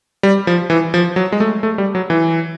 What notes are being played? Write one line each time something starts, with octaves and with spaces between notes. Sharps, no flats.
G3
F3
E3
F3
F#3
G#3
A3
A3
G3
F#3
E3